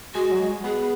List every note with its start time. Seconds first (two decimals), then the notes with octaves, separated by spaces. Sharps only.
0.14 G#3 F#4
0.32 F#3
0.39 G#3
0.64 B3 G#4